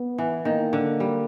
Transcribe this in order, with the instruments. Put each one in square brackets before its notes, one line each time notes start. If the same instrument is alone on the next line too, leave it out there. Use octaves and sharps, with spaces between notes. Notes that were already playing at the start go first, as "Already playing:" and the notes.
Already playing: [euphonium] B3
[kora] E3
[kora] D#3 [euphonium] A#3
[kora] D3
G3